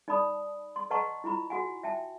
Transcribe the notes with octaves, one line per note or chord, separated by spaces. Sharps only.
D#4 D5 A5 B5 D#6
C6
B4 D#5 F#5 A5 A#5 C#6
E4 F4 A#5 B5
F#4 F#5 G#5
E5 G5 A5